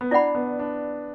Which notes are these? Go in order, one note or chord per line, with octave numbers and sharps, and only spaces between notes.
B3
D4 E4 D5 F#5 B5
B3
D4